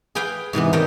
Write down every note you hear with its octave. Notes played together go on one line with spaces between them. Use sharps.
G#4 B4 F5 G5
G#2 C3 E3 B3
G#2 D3 D#3 A3 A4 G5